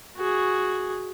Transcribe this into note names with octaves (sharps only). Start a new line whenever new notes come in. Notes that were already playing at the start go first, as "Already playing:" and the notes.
F#4 G#4